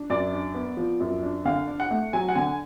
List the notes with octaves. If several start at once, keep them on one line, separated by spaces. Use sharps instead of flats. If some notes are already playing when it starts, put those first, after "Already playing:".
Already playing: D4
F#2 D5
D4
B3
F3
F#2
D4
D3 F5
D4
F#5
A3
F#3 G#5
F#5
D3 G#5